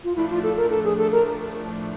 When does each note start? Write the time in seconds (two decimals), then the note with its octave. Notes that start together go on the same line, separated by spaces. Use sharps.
0.04 F4
0.16 A2 F3 A3 D4 E4
0.30 F4
0.43 A4
0.57 A#4
0.71 A4
0.84 G#4
0.98 A4
1.12 A#4